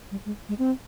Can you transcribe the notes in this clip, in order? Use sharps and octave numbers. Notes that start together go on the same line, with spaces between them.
G3
G#3
G#3
C4